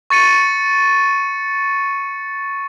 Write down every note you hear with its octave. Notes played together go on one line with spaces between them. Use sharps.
C#6 A6 C#7 D#7